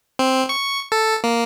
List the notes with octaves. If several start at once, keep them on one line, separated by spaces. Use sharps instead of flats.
C4
C#6
A4
A#3